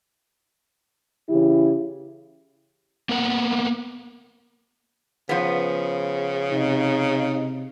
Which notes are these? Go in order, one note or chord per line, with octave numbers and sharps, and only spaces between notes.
C#3 E3 E4 G4
A#3 B3 A#4 F#5
C#3 F3 B3
C3 D#4